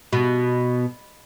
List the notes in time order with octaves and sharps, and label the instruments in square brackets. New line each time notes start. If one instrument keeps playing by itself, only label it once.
[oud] B2